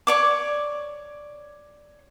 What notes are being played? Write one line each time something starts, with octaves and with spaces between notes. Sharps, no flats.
C#5 D5 D6